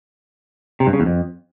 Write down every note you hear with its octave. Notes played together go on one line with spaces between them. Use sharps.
C3
G2
C#3
E2
F2